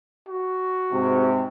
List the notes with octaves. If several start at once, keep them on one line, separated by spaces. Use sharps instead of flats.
F#4
G#2 C3